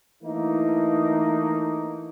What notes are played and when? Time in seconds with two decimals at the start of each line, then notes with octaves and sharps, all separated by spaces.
0.22 E3 A3 A#3 D#4